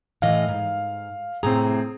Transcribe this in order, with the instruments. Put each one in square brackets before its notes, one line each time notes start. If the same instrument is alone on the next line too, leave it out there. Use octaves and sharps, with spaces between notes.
[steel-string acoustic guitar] A2 E3 D#5 [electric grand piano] F5
[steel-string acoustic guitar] G#2
[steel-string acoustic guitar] A2 C3 A#5 [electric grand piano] C4 G#4